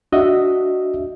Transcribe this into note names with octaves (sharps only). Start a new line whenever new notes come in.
D4 F#4 D#5 E5